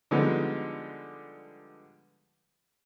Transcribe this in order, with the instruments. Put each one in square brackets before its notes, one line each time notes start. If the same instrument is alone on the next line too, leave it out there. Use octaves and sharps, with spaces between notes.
[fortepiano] D3 F3 G3 G#3 B3 D#4